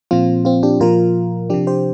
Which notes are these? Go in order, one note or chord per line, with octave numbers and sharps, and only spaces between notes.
A#2 F3 C4 F4
C4 F4
D4 G4
A#2 F3 F4 A#4
C3 F3 D4 G4
G4 C5